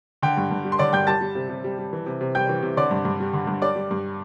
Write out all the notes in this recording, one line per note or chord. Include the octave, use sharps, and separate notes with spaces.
D3 G5
G2
G2
G3
C6
D3 D5 D6
G2 G5 G6
G3 A5 A6
G3
C3
C3
G3
G3
E3
C3
C3
G3 G5 G6
E3
C3
D3 D5 D6
G2
G2
G3
D3
G2
G3 D5 D6
G3
G2